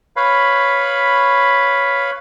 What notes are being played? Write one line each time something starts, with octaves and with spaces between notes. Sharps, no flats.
B4 C#5 F5 B5